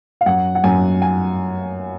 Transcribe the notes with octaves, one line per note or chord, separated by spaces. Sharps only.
F5
F#2 F#5
F#5
F#2 G#5
G#5